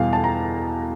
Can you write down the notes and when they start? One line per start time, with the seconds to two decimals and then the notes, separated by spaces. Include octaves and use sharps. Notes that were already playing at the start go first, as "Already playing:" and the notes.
Already playing: E2 B2 G3 F5
0.13 A5
0.24 A#5